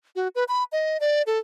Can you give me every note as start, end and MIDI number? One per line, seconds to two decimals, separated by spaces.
0.16 0.28 66
0.35 0.44 71
0.48 0.64 83
0.72 0.97 75
1.00 1.22 74
1.27 1.39 69